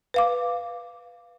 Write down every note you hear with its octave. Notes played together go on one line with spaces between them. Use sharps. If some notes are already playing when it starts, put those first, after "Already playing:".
B4 F5 D6